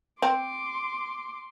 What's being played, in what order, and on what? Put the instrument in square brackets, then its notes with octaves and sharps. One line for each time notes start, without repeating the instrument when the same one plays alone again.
[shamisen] C4 [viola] C6 D6